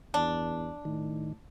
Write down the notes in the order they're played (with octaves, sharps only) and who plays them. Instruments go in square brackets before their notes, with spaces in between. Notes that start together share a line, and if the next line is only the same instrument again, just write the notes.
[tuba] E2 [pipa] D4
[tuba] A2 [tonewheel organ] D#3